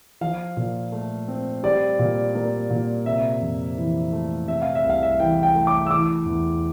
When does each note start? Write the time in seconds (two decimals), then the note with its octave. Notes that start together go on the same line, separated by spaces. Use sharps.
0.21 F3 F5
0.57 A#2
0.92 A3
1.28 C4
1.63 G3 D5
1.99 A#2
2.35 A#3
2.70 A#2
3.06 C3 E5
3.41 F2
3.77 E3
4.13 A3
4.48 C3 E5
4.62 F5
4.75 E5
4.84 C2
4.90 F5
5.03 E5
5.19 E3 G5
5.43 G5
5.55 A3
5.67 D6
5.86 E6
5.91 E3 D6
6.26 E2